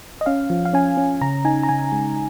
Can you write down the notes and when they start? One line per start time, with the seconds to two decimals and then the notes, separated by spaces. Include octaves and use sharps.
0.21 D#5
0.26 C#4 F5
0.50 F3
0.65 F5
0.73 C#4 G#5
0.97 C#4
1.21 C#3 A#5
1.45 D#4 G#5
1.63 A#5
1.69 C#3 G#5
1.92 G#3